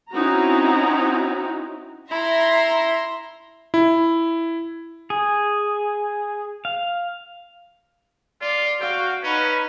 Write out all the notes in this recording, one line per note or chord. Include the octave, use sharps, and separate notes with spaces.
C4 C#4 D#4 E4 F#4 A#5
E4 E5 A#5 C6
E4
G#4
F5
F4 D5
F#4 F5 G5
C#4 D#4 B4